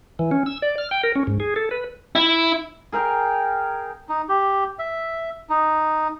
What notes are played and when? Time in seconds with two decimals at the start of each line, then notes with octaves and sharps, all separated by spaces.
0.19 E3
0.31 C#4
0.46 E6
0.62 D5
0.78 F6
0.91 G5
1.03 A#4
1.15 C#4
1.27 G#2
1.40 G#4
1.56 A4
1.71 B4
2.15 E4
2.92 G#4 A#4 F5 G5
4.09 D#4
4.29 G4
4.79 E5
5.49 D#4